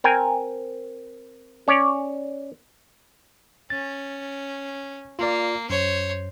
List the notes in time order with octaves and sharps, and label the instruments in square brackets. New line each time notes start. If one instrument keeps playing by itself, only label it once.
[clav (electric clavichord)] C4 A#4 G5 G#5
C#4 C#5 D5
[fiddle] C#4 [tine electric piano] A6
[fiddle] A#3 [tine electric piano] F4 D5
[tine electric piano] F#2 [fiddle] C5 C#5